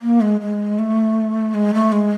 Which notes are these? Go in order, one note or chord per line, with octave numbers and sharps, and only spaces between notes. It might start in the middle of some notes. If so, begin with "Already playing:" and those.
A#3
G#3
G#3
A3
G#3
A3
G#3